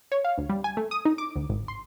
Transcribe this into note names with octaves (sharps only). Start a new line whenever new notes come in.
C#5
F5
D2
G3
G#5
A3
D#6
D#4
D6
D2
G#1
C6